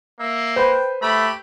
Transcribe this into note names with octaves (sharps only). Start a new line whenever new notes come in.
A#3 E5
B4 C5 G5
A3 G4 B5